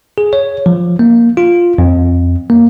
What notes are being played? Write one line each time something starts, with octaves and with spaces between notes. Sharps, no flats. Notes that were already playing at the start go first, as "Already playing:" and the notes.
G#4
C#5
F3
A#3
F4
F2
A#3